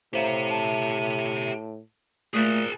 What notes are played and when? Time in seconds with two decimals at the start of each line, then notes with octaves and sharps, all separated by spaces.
0.14 A2 G4 C5 E5 F5 A#5
0.51 A5
2.34 A#2 A3 G#4 A#4 D#6 F#6 A6